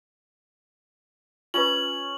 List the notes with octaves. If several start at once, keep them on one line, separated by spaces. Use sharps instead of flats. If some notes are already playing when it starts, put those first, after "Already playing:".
C#4 F4 B4 F#7